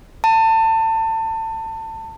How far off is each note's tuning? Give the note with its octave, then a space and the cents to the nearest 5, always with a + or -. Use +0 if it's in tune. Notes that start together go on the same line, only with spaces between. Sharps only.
A5 +25